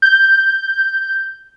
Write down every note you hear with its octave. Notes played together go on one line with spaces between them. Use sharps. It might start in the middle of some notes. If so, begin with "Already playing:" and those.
G6